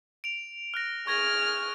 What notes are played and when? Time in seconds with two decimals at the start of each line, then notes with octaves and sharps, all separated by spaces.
0.24 D7 F7
0.74 F6 F#6 A#6
1.07 G#4 C#6 F6 G#6 A#6